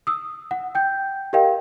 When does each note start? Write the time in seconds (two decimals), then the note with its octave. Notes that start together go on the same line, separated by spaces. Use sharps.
0.07 D#6 E6
0.51 F#5
0.75 G5 G6
1.33 G4 A#4 D#5 F5 G5